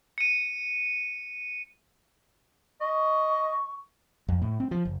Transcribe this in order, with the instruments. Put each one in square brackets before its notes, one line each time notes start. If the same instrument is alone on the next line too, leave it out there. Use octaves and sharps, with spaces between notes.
[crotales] C#7 D#7
[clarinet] D#5 [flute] C#6
[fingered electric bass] F2
A2
C4
F3
F#1